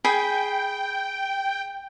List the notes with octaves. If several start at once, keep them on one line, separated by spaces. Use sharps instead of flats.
G#4 G5 B5